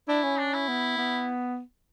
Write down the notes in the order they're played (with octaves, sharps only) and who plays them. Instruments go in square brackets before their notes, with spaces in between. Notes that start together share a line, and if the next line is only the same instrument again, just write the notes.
[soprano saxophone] D4 [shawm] E4
[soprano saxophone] C#4
[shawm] D4
E4
[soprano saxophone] B3
B3